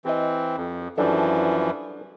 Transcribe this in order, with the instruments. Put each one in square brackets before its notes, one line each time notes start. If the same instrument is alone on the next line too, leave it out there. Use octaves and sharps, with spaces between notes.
[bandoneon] E3 C4 [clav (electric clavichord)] G4 D#5
[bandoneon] F2
[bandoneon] F#2 E3 F3 [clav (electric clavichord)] G3 D4 A4